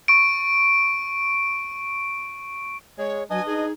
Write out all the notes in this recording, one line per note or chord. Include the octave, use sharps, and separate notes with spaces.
C#6 D7
G#3 C#5
F#3 D4 B4 D#5 G#5
D#4 G#4